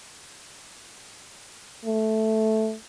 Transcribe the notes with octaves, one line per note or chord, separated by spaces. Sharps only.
A3